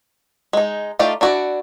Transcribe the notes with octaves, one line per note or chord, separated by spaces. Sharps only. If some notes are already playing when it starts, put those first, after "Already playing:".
G#3 D#4
A3 D#4 F4 G4 D5
D4 E4 F#4 C#5 D5